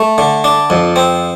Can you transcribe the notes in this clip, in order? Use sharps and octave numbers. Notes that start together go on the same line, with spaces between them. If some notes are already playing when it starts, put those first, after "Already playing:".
Already playing: A3
D3
D4
F2
C4